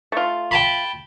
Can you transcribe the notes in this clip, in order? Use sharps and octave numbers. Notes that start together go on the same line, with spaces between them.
A3 F4
G5 A5 B5